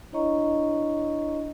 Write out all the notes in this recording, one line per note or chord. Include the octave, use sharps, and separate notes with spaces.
D4 E4 C#5 D#5 A#5 C#6